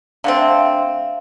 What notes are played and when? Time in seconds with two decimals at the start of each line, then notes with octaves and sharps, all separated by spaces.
0.24 D3 A3 C4 F5
0.37 E5
0.48 F5